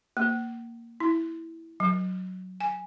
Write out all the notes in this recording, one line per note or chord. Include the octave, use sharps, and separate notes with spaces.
A#3
E4
F#3
G#5